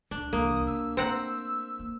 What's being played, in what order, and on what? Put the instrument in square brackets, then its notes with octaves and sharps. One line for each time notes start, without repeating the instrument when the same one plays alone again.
[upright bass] C#2 [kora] D4
[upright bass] C2 E3 [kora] A#3 [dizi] D#6
[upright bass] D2 C#3 [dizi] E6
[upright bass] A3 [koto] C4 F#5 A#5 [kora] C5
[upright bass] A#3